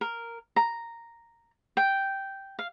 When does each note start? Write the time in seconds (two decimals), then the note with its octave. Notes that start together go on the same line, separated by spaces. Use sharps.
0.01 A#4
0.56 A#5
1.77 G5
2.59 F5